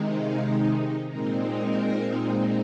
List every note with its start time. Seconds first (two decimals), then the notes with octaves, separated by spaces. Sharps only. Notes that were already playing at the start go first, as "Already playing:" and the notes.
Already playing: C3 D#3 G#3 D#4
0.17 F5
1.10 A#2 G#3 C4 D#4 A#4
1.57 A#4